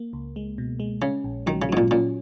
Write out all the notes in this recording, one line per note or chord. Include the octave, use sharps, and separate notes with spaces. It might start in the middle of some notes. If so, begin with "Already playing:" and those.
Already playing: A#3
C#2
G#3
B2
G#3
C#3 C#4
A#1
D#3 F#3
C#3
G#2 F#3
A#2
A#2 C#4